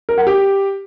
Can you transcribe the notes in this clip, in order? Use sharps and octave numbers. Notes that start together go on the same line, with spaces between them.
A#4
F#5
G4